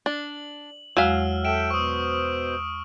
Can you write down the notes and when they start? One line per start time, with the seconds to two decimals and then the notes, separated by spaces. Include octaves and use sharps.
0.06 D4 F#7
0.97 E2 F#3 G#3 F5 E6 F6
1.45 A4 E5 G5 D7 E7
1.70 B2 C5 C#6 D#6